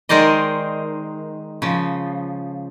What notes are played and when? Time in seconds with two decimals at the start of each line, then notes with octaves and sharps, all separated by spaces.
0.09 D#3 G#3 A#4 C5 D5 D#5
1.62 C#3 F3